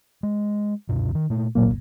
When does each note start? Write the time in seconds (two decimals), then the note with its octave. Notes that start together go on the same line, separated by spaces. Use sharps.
0.23 G#3
0.89 C#2 F#2 B2
1.15 D#3
1.30 A#2 A3
1.55 G1 C2 A#2 F#3 A#3